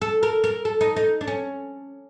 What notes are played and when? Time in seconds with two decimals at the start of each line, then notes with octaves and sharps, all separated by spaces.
0.02 A4
0.23 A#4
0.44 A#4
0.65 A4
0.81 D#4
0.96 D#4
1.21 D4
1.27 C#4